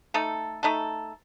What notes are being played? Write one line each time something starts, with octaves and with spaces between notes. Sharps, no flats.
A3 D#4 A4
A3 D#4 A4